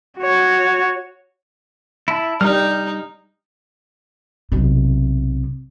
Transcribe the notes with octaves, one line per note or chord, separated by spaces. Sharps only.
F#4 C#5
E4 A5
G3 D#4 F6 G6
B1 C3